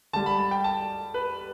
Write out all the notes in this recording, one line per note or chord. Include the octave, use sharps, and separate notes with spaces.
D3 G3 A5
B5
A5
G5
A5
B4